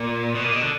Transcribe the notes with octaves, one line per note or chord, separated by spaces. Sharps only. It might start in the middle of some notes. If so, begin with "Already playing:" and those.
Already playing: A#2
B2
A#2
B2
D3